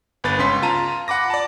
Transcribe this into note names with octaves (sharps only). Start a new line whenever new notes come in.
G1 B3 B4 A6
C#2 C#4 C6 B6
F4 A5 A#5 D#7
F#5 B5 D6 A#6
D5 A5